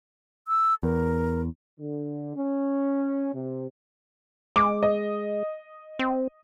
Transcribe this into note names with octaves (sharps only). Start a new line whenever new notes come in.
E6
E2 A#4
D3
C#4
C3
G#3 D6
D#5
C4